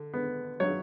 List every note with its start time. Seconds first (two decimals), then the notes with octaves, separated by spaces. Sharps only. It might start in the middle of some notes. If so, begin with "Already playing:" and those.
Already playing: D3
0.13 B3
0.60 F#3 C#5